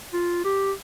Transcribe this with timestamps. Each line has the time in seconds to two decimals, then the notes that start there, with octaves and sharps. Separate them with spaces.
0.13 F4
0.45 G4